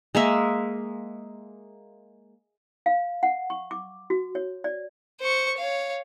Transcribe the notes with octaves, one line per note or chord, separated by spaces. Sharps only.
G#3 A#3 E5
F5
F#5
C#6
D6
F#4
C#5
D5
C5 C#6
C#5 F5